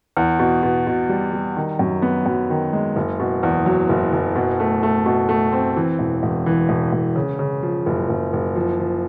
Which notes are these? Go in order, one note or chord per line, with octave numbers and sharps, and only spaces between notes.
E2
B2
B2
B2
G3
G3
D#3
F#2
B3
F#2
D#3
G#3
F#1
B2
E2
F#3
F#1
F#1
B2
A3
A3
B2
A3
C4
E3
E1
E1
E3
E1
E1
C#3
C#3
F3
F#1
F#1
F#1
F3
F3